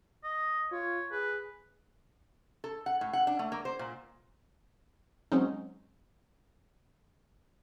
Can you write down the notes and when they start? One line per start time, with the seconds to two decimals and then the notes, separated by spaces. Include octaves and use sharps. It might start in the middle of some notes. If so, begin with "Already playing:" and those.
0.24 D#5
0.72 F4 C#5
1.11 G#4 B4
2.64 A4
2.86 F#5
3.01 A2
3.13 F#5
3.27 D4
3.39 A3
3.52 A#3
3.65 C5
3.79 A#2
5.32 F#3 G#3 C4 C#4 D#4